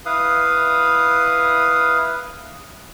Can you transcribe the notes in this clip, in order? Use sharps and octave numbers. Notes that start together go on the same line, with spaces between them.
E4 B4 F5 D#6